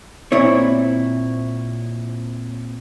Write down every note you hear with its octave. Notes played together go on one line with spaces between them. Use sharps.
A#2 C4 E4 C#5